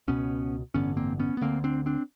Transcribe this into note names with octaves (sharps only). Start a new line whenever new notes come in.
C#2 B2 B3 C#4
A1 G2 D3 B3 C#4
A#3 C4
B3 C#4
B3
D2 D3 A#3 C4
C4 D4
C4 D4